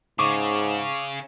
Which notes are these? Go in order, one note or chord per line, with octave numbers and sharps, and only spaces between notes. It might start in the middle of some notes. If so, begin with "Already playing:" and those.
G#2 C#3 C#6 D6